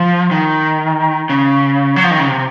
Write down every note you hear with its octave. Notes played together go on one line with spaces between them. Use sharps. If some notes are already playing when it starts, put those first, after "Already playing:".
Already playing: F3
D#3
C#3
F#3
F3
D#3
C#3
C3